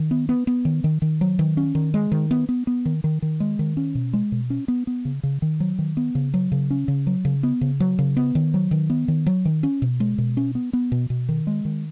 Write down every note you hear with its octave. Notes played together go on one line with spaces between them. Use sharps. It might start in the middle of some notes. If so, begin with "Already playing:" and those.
Already playing: D#3
B3
B3
B3
D#3
D#3
D#3
F#3
D#3
C#4
D#3
G#3
D#3
B3
B3
B3
D#3
D#3
D#3
G#3
D#3
C#4
B2
G#3
B2
C#4
B3
B3
C#3
C#3
D#3
F#3
D#3
B3
C#3
F#3
C#3
C#4
C#3
F#3
C#3
B3
C#3
F#3
C#3
B3
D#3
F#3
D#3
B3
D#3
F#3
D#3
C#4
B2
G#3
B2
C#4
B3
B3
B2
B2
D#3
G#3
D#3